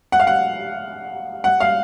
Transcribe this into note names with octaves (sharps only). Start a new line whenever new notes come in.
F#5
F5
F#5
F#5
F5